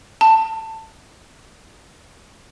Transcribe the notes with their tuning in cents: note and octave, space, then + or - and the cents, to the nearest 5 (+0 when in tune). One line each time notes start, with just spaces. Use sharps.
A5 +15